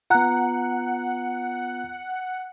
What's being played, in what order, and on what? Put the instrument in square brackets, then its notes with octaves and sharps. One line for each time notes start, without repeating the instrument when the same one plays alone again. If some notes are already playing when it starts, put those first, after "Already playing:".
[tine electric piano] B3 F4 [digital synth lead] F#5 [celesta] A#5 F#6